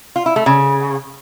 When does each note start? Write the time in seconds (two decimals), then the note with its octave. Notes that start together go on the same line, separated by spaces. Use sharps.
0.16 F4
0.26 E4
0.36 A3
0.46 C#3